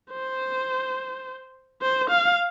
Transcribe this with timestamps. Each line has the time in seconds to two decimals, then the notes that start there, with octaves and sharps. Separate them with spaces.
0.11 C5
1.82 C5
2.10 F5